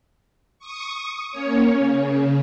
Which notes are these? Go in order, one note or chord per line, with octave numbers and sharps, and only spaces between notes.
C#6 D#6
A#3 C#4 C#5
C#3